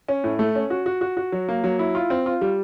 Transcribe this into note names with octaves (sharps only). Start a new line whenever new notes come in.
C#4
A2
A3
C#4
F#4
F#4
F#4
F#4
F#3
A#3
F#3
E4
F4
C4
F4
G3